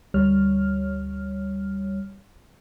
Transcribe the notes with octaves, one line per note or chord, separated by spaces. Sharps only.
D2 G3 C#5 F6